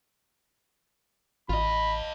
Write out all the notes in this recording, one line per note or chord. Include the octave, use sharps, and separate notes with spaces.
A1 F4 D#5 B5